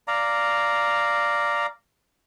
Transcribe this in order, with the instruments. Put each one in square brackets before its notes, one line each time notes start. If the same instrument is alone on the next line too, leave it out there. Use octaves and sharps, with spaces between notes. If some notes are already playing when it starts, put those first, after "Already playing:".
[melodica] D5 F5 A#5